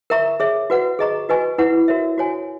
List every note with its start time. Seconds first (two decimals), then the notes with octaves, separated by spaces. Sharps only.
0.10 A#4 E5 A#5 C#6
0.40 G#4 C#5 E5
0.70 F#4 B4 F#5
0.99 G#4 D#5 A#5 C#6
1.29 F#4 B4 D#5 G#5 C#6
1.58 E4 B4 F#5 C#6
1.88 F#4 A#4 C#5 E5
2.18 F#4 C#5 G#5